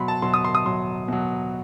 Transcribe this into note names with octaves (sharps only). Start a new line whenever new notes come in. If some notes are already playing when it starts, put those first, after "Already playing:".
Already playing: B2 F#3 B5 C6
A5
B2 F#3 C6
D#6
C6
D#6
B2 F#3 C6
B2 F#3